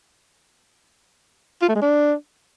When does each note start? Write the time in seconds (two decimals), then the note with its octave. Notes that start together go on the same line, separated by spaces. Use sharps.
1.62 F4
1.69 A3
1.75 G#3
1.82 D4